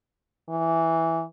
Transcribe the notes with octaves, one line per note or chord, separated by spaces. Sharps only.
E3